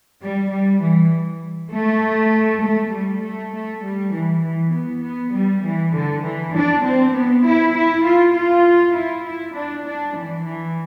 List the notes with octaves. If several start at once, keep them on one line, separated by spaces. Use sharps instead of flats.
G3
G3
E3
A3
A3
G3
A3
A3
G3
E3
E3
B3
B3
G3
E3
D3
E3
D4
C4
B3
E4
E4
F4
F4
E4
E4
D4
D4
E3
E3